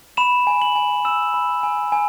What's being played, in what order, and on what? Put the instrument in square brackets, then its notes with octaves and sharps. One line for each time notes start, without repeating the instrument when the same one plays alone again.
[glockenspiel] B5 E7
G#5
F#7
G#5
E6 E7
B5
G#5
G#5